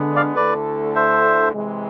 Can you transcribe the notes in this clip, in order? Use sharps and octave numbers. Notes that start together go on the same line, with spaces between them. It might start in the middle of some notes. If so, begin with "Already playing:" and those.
Already playing: D3 G#3 B3 D4
D5 F5
D2 D3 A3 E4 A4 B4 D5
C5 E5
C3 E3 G#3